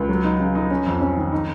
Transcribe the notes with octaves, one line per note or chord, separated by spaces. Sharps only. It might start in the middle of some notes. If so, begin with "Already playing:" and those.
Already playing: C#2
F#3
D#4
C#3
D#4
C#4
F2
C#4
D#3
D#4